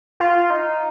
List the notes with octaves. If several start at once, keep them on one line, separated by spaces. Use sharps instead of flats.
F4
D#4